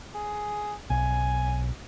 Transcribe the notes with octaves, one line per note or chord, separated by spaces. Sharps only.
G#4
B1 G#5